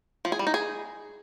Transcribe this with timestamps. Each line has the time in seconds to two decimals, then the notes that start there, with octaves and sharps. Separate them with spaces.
0.25 F3
0.32 G#4
0.39 G3
0.47 D#4
0.54 G#4